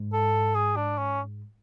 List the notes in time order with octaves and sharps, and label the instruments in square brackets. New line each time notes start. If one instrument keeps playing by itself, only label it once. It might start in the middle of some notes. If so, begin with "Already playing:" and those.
Already playing: [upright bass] G#2
[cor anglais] A4
G#4
D4
C#4